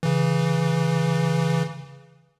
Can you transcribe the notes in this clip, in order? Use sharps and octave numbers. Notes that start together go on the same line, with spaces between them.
C#3 E3